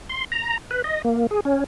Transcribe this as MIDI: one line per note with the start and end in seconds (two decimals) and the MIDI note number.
0.09 0.24 84
0.32 0.58 82
0.71 0.82 71
0.84 1.02 75
1.05 1.27 58
1.31 1.40 68
1.45 1.64 61